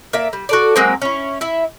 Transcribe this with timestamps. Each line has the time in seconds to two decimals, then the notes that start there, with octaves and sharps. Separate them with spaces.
0.13 A#3 D5 E5
0.33 G3
0.49 F#4 A4 D5
0.76 F#3 G#3 A#3 C4
1.02 C#4 E4
1.41 E4 E5